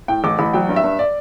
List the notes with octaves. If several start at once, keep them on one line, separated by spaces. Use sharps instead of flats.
A2 G5
A1 D6
A1 B5
F#3 G5
G2
E5
G2
D5